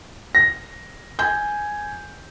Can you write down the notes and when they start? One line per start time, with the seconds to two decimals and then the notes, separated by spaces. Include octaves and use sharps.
0.35 A#6
1.19 G#5 G6